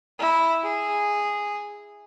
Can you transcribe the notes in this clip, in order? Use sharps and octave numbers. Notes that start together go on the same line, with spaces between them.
E4
G#4